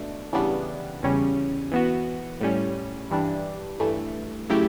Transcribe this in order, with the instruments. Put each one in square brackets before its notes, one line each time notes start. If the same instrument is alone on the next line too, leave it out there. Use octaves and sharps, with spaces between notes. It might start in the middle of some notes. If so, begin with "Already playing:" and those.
Already playing: [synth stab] B2 A3 D4
C#3 E3 G3 B3 D4
E2 C#3 G3 C#4
E3 B3 F#4
A2 G3 C#4
G2 E3 G3 D4
G2 E3 A3
C#3 F#3 A3 E4 G4